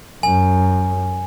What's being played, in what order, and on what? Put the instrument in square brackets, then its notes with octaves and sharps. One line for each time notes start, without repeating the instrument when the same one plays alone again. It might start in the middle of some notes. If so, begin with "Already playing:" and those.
[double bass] F#2 [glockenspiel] G#5